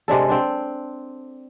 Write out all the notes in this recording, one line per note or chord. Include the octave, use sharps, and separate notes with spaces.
C3 G#3 D4 A4
C4 D4